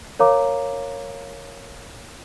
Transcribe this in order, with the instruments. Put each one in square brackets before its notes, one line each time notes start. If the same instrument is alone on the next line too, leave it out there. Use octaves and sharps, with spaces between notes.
[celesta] A#4 C#5 F5 A#5 D6